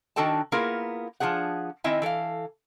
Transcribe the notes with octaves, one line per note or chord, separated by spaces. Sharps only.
D#3 D4 F#4 A4 G5 A5
A#3 B3 E4 F4 G#4 A#4
F3 A3 D4 G#4 F#5
D#3 C4 E4 D#5 E5 G#5
E3 A4 A#4 F5